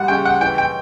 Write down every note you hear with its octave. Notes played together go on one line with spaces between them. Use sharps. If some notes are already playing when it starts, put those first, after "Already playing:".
Already playing: G3 F#5
C#3 G5
F#5
E3 G5
G5